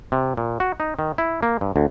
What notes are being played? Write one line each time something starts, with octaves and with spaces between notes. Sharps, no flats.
C3
A#2
F#4
D#4
D#3
E4
A#3
G2
D2